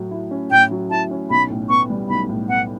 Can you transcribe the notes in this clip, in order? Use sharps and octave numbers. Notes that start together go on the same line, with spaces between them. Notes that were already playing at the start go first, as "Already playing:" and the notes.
Already playing: A2 F#3
E4
C#4
A2 G5
F#3
E4 A5
C#4
B1 B5
A2
B3 C#6
G3
B1 B5
A2
B3 F#5